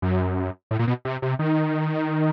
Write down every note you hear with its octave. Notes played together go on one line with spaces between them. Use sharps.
F#2
A2
A#2
B2
C3
C3
D#3